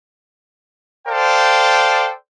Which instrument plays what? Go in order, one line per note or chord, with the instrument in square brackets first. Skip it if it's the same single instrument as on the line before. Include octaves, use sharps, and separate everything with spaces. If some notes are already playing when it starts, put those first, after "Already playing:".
[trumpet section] A4 C5 D5 F5 G5